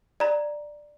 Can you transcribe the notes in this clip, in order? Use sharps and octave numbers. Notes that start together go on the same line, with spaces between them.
D5 A#5